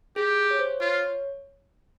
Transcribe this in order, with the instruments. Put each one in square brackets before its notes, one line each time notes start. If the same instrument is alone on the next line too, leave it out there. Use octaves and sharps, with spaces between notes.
[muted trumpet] G4 [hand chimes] G#4
[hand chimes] C#5
C5
[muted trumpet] F4 [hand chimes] C#5